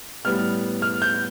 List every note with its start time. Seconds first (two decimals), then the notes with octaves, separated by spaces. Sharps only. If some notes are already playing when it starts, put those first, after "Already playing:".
0.25 A2 G3 B3 F6
0.82 F6
1.02 G6